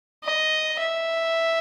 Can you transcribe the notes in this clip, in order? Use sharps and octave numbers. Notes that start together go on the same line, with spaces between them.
D#5
E5